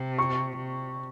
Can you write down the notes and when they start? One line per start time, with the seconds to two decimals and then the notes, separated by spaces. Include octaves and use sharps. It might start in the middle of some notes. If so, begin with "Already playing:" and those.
Already playing: C3
0.19 C#6
0.57 C3